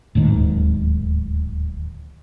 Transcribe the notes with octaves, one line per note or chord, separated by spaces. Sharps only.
D1 D#2 G#2 D#3